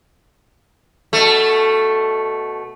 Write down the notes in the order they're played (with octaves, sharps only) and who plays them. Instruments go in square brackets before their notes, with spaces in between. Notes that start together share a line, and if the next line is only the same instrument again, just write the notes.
[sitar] B2 A3